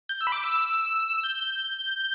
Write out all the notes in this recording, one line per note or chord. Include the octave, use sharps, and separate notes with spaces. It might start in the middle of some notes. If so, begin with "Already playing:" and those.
G6
E6
B5
D6
E6
G6